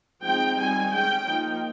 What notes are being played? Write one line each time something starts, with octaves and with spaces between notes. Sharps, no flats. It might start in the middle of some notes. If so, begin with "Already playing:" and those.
F3 G#3 C4 D#4 G5
D#3 G3 C4 D#4 G#5
G#3 C#4 G5
F3 A#3 D#4